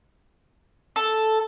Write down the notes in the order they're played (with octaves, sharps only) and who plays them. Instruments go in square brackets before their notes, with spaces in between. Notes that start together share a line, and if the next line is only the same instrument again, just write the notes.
[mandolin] A4